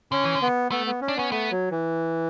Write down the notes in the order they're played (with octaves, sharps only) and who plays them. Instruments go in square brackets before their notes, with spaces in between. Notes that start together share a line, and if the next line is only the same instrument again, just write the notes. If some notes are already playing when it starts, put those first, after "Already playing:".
[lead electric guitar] D3 [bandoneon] C#4
[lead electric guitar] E3
D3
[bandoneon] B3
[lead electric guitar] A3 [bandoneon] B3
[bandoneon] B3
C#4
[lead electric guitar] D4
[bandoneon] B3 [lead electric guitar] C#4
[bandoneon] A3 [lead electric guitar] B3
[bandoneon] F#3
E3